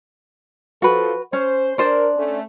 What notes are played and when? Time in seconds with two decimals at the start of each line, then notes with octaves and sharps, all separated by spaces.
0.82 F3 F#4 A4 B4
1.33 C#4 C5
1.78 D4 A#4 C5 D5
2.17 A3 C#4